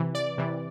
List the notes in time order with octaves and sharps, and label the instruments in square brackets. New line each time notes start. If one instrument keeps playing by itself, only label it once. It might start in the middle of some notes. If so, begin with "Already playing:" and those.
Already playing: [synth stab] C3 E3
D5
C3 E3